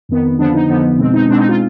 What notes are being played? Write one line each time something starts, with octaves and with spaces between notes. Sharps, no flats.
F2 D#3 B3
F2 D3 F3 B3 D4
D#4
F2 D3 F3 B3
B2 G#3 C4
D#4
B2 G#3 C4 D4
D#4
F4